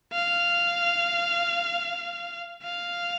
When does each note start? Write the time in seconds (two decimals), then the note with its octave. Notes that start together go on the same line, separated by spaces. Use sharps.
0.13 F5
2.63 F5